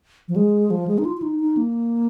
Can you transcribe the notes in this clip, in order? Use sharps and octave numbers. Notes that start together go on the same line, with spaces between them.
F3
G#3
F3
G#3
D#4
F4
F4
D#4
D#4
A#3